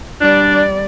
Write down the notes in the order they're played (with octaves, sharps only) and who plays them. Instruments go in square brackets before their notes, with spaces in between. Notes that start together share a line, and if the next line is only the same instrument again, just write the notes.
[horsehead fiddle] G3 D5 [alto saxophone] D4